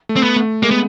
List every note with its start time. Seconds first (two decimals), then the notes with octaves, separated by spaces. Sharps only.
0.09 A3
0.16 C4
0.23 B3
0.36 A3
0.63 G#3 A#3
0.71 B3